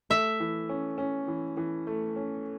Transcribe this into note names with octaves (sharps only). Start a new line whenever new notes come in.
A3 E5
E3
C#4
C#4
E3
E3
A3
C#4